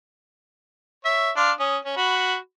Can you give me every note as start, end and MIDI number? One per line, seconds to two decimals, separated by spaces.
1.05 1.31 73
1.05 1.31 76
1.37 1.51 62
1.37 1.51 77
1.37 1.51 84
1.60 1.78 61
1.60 1.78 87
1.85 1.96 61
1.97 2.35 66
1.97 2.35 83